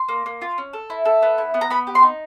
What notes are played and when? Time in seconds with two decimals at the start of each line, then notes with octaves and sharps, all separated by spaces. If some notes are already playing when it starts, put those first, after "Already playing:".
Already playing: C6
0.09 A#3
0.26 A#3
0.42 F4
0.58 C#4
0.73 A4
0.90 E4
1.05 A4
1.22 B3
1.38 E4
1.54 B3
1.61 A#5
1.70 B3 B5
1.87 G4
1.95 C6
2.03 D#4